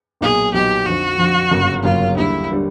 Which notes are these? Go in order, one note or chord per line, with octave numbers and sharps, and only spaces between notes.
B1 A#2 F#3 B3 D#4 G#4
B1 A#2 F#3 B3 D#4 G4
F2 D3 F3 F#4
F2 D3 F3
G1 F#2 C#3 F#3 A#3
G1 F#2 C#3 F#3 A#3 F4
D#2 D3 G3 E4
D3 G3